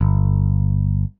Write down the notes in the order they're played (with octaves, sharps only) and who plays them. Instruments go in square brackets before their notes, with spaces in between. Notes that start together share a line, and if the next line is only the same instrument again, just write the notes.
[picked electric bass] G1